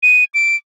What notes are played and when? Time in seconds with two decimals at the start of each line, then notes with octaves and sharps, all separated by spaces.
0.03 D#7
0.34 D7